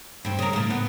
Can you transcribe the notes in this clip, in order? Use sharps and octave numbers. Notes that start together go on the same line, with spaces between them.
G2 C4
C#3 A#4
A2 C#3
B3